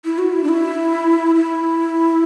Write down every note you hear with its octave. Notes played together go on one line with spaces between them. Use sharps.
E4
F#4
E4
D4
E4
E4